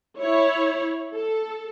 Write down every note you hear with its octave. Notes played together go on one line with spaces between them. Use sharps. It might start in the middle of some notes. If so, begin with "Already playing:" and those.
E4 C#5
A4